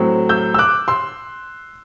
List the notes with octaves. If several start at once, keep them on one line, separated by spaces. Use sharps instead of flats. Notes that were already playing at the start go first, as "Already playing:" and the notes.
Already playing: A2 F#3 C4
E6 G6
E6
D6 F#6
C6 E6